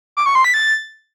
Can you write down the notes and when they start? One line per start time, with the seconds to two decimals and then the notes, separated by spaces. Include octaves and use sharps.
0.17 D6
0.26 C#6
0.35 C6
0.44 B6
0.54 A6